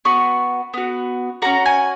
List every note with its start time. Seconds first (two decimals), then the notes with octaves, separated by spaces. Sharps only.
0.05 B3 F#4 C#6
0.74 B3 F#4
1.42 C#4 F#4 A#5
1.66 G#5